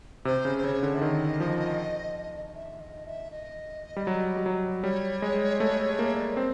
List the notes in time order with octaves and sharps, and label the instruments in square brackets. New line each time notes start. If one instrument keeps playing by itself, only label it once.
[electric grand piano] C3 [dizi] C5
[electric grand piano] C#3
[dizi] C5
[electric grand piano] C#3 [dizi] C#5
[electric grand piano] D3
[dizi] E5
[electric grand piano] D3
[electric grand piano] D#3 [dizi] D#5
[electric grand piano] F3
[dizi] E5
D#5
E5
D#5
[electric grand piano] G3
F#3
G3
F#3
[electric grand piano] G3 [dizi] C#5
[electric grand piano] G#3
A3
A#3
[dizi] D5
C#5
[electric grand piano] C4 [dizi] C5